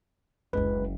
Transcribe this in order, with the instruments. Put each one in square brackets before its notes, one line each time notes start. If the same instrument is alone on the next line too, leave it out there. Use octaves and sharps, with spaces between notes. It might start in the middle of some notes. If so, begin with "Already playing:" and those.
[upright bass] F#1 D2 [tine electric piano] G#3 B4